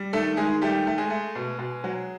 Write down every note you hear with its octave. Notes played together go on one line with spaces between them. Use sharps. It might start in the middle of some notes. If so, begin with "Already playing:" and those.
Already playing: G3
D#3 A3 A4
D#3 G#3 G#4
G3 A3 G4
A3
G#3 G#4
A3
B2
B2
F#3